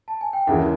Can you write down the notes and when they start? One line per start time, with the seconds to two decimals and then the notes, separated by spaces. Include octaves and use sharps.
0.08 A5
0.21 G#5
0.33 G5
0.47 D#2 C#3 E3 G#3 E5 F#5